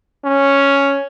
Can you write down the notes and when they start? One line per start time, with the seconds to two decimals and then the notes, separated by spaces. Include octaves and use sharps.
0.24 C#4